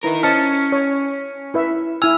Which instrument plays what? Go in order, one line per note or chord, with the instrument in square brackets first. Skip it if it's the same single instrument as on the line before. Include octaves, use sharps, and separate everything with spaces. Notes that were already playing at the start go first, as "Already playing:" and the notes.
[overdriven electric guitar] D#4 A#4 [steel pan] E4 B4
[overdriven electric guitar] C#4 [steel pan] C5 D#5 A5 [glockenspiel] F6 C#7
[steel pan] C#5
E4 B4 E5
[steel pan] E4 G#5 [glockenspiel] E6 F6 F7